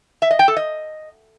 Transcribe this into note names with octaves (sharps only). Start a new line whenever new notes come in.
E5
D#5
G5
A4
D#5